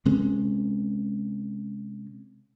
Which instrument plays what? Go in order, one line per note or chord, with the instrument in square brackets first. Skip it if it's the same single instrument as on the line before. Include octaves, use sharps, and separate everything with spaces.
[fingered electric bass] C3 G#3 C4 C#4